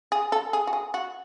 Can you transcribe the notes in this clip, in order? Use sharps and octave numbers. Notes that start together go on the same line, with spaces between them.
G#4
A4
G#4
F#4
G#4
F#4